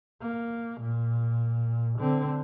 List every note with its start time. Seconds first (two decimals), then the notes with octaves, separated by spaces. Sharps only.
0.22 A#3
0.81 A#2
2.00 D3 C4